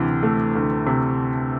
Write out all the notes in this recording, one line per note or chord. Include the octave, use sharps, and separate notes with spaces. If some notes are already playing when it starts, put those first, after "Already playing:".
Already playing: D2 C3 E3
A3
D2
C3